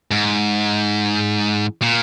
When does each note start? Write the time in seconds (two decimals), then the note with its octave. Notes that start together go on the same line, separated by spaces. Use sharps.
0.11 G#2
1.82 A#2